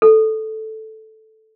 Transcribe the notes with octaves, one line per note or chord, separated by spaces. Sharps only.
A4